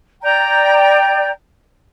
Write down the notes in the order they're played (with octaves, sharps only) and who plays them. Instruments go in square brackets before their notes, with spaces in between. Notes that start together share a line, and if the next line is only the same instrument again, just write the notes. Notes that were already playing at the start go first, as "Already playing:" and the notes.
[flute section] D5 G5 A#5 G6